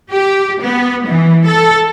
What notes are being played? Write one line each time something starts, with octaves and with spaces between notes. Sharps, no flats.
G4
B3
E3
A4